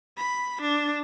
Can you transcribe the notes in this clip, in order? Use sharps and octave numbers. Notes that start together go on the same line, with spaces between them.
B5
D4